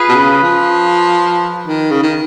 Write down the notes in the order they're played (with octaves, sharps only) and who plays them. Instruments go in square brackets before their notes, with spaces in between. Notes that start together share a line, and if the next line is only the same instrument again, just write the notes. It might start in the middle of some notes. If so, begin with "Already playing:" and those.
Already playing: [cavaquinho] F4 G#4 B4 F5
[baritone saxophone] B2
C#3
F3
D#3
C#3
D#3